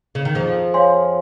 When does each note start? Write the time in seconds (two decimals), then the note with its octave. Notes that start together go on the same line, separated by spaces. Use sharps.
0.15 C#3
0.25 D#3
0.35 F2 F3 G#4
0.74 C#5 F5 G#5 C6